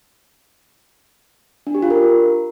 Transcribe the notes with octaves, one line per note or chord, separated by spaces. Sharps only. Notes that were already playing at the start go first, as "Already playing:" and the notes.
D4
G4
F4
A#4